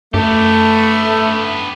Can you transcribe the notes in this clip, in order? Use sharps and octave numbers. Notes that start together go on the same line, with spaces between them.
F#2 A3 B3 G4